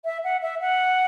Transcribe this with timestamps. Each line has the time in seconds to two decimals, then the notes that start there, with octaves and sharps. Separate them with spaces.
0.04 E5
0.24 F#5
0.42 E5
0.60 F#5